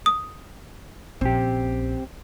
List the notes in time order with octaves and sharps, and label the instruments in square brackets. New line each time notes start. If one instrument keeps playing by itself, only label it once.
[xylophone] D#6
[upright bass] A#1 C#4 [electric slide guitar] C4 G4